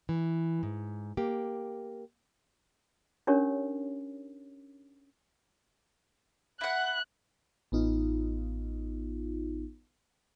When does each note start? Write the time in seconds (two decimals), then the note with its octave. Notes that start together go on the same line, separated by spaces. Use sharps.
0.09 E3
0.63 G#2
1.17 A#3 G4
3.27 C#4 D4 G4 A#4 C#5
6.61 E4 F#5 F#6
7.72 A1 B3 D#4 F4